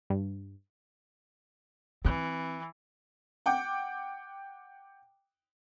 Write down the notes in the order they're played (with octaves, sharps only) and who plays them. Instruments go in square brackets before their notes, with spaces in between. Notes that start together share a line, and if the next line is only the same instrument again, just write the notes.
[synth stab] G2
[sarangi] E3 [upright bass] C4
[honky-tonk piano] F#5 G5 D6